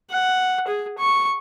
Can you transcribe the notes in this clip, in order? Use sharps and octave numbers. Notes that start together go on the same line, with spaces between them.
F#5
G#4
C#6